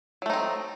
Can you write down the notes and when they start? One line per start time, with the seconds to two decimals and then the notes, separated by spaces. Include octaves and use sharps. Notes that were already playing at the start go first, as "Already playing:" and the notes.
0.22 F#3
0.26 A3
0.30 D#4
0.33 C4